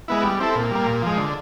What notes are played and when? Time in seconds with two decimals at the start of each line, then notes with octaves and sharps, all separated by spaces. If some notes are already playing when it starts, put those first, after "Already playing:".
0.08 G#3 B3 E4
0.24 G3
0.40 C4 E4 A4
0.55 A#2
0.71 G3 A#3
0.86 A#2
1.02 F3 G#3
1.18 D3